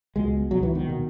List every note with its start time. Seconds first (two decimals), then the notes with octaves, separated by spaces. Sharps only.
0.16 C#2 B2 G#3
0.51 C#2 B2 F#3
0.63 E3
0.75 D#3
0.89 B2